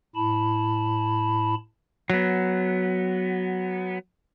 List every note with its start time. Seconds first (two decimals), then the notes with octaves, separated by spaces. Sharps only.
0.16 A2 E4 A5 B5
2.10 F#3 B3